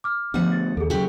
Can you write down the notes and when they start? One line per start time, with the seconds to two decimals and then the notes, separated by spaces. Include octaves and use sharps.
0.04 D6 F6
0.34 D2 F3 B3 F#5
0.52 A6
0.77 D#2 G#4 A4
0.90 C#3 F#3 F#4 G4